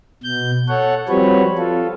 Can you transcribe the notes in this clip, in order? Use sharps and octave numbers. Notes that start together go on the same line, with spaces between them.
B2 G6
A4 C#5 F#5
F3 G3 C4 F#4 B4 C#5
F4 A4